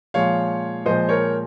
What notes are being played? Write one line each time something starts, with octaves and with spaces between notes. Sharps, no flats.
A#2 F3 G#3 C#5 F5
A#2 F3 G#3 C5 D#5
A#4 C#5